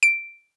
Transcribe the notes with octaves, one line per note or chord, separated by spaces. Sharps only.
D7